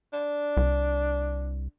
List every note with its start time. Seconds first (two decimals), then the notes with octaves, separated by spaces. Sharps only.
0.13 D4
0.57 C2